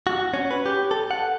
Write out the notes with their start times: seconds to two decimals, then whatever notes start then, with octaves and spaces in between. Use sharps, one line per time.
0.07 F#4
0.34 C#4
0.51 B4
0.66 G4
0.91 A4
1.11 F#5